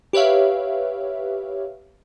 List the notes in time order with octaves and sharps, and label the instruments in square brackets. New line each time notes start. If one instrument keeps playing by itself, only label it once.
[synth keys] G4 B4 C#5 E5 F5